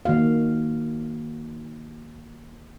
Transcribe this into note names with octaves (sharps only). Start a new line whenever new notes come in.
D#3 A#3 F#4 F5